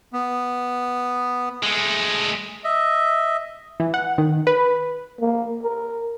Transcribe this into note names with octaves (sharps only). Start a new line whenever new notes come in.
B3
G#3 A3
D#5 E5
E3
F#5
D#3
B4
A#3
A#4